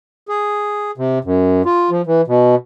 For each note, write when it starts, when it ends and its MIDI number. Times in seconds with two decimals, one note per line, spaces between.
0.29 0.91 68
0.97 1.19 48
1.24 1.62 42
1.65 1.90 65
1.90 2.02 53
2.07 2.21 52
2.27 2.55 47